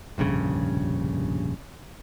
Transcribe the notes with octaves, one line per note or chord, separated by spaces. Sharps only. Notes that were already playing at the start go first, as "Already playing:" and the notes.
F1 A#1 G2 C#3